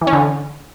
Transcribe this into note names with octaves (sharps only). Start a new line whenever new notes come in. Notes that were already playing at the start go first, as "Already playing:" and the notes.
E3
C#4
D3